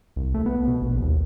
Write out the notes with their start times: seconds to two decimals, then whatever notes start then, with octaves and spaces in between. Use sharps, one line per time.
0.16 C2
0.34 A3
0.46 B3
0.68 B2
0.82 A#1
1.02 D#2